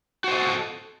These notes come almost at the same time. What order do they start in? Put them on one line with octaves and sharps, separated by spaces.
F#4 C5 D#5 A4